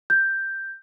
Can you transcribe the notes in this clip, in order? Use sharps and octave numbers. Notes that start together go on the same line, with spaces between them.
G6